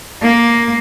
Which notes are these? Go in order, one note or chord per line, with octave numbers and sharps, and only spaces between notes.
A#3